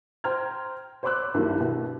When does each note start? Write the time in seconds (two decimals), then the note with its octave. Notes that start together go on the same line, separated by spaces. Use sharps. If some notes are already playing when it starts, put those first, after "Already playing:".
0.24 C5 G5 A#5 F6 G#6
1.03 C5 C#5 B5 D6 E6 F#6
1.34 C2 G2 D#3 F#3 A#3
1.60 B2